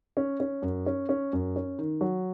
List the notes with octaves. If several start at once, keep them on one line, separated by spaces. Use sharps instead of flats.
C#4
C#4
F#2
C#4
C#4
F#2
C#4
D#3
F#3